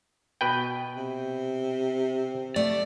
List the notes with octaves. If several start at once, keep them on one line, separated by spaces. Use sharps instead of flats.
B2 B4 G5
C3
A3 D5